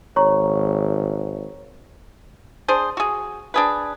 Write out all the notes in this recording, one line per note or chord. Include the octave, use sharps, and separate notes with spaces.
G#1 C#5 A#5 C#6
D4 G#4 C5
F#4 G#4
D4 G#4 B4